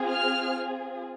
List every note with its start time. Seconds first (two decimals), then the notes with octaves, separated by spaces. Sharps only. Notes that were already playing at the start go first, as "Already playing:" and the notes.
Already playing: C4 F4 G#4
0.10 F6